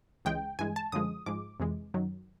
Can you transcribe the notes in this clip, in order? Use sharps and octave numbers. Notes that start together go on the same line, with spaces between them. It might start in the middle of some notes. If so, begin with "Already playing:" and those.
C#2 C#3 E3 G#3 G5
G2 E3 G#3 G#5
A5
F#2 D3 F3 G#3 D#6
G#2 F3 G#3 D6
F2 C3 E3 G#3
F#2 D#3 F#3